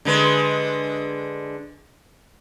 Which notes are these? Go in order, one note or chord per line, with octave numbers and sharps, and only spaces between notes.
D3 G#3 B4